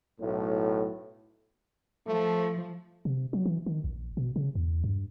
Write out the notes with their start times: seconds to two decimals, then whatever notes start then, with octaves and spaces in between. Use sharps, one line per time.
0.20 B1 A2
2.07 F3 A3
3.05 C3
3.33 F#3
3.46 E3
3.66 D#3
3.84 A#1
4.17 B2
4.36 C#3
4.55 E2
4.84 G2